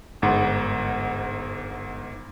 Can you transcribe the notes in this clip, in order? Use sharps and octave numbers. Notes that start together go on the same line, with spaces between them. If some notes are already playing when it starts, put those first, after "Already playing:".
G1 G#2 F#5